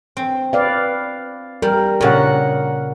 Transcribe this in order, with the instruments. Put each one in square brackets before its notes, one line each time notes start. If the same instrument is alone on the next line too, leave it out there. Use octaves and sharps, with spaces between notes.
[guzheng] C4
[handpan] B4 D5 F5
[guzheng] G3 [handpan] A#4
[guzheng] A#2 C#3 [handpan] A#4 F#5